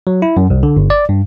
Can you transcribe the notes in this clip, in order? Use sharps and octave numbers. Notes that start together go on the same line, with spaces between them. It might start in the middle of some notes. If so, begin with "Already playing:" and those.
F#3
E4
F#2
C2
D3
G1
D5
G2